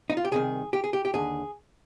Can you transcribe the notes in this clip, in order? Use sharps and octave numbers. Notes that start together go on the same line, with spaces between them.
D#4
F4
G4
C2 C3 D#3 G#4
G4
G#4
G4
G4
D#2 D3 G#4